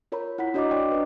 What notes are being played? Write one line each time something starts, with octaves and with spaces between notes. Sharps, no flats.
F4 A#4 C#5 A#5 B5
E4 F#5 B5 B6
D4 F#4 C#5 D#5 A#5 D6
D5 D#5 G5 C#6
D4 B4